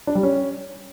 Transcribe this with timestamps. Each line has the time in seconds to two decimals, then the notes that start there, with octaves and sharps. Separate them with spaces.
0.07 D4
0.15 G3
0.23 C#4